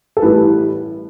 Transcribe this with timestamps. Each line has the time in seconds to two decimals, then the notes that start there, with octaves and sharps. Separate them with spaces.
0.17 A4
0.22 A1 A2 E3 G3 B4